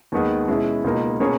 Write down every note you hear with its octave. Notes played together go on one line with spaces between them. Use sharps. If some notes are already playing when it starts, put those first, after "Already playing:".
D#2 D#3 G#3 B3
B2 G#3 C#4 E4
C#2 B2 A#3 D#4
B2 A#3 C#4 G#4 C#5